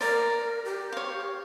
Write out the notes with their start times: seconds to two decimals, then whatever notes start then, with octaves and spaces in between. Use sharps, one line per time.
0.01 A#4 D5 A#5
0.65 G4
0.92 C#5 F5